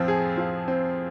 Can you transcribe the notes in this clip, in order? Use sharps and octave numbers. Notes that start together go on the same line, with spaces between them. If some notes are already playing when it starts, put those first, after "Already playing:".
Already playing: F2 F3 C4
G#4
F3
C4